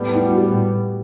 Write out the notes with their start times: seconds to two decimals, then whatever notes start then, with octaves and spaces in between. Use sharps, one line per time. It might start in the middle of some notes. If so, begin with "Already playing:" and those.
Already playing: A2 G3 B3
0.15 E4
0.26 F#4
0.38 G4